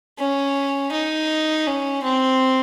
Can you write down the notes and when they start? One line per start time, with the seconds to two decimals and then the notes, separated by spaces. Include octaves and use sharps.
0.19 C#4
0.92 D#4
1.66 C#4
2.03 C4